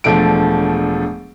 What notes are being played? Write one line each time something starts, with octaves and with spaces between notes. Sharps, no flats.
E1 F3 A3 D4 A4 D7